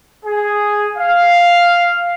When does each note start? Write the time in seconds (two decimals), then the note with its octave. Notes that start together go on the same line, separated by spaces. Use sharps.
0.25 G#4
0.97 F5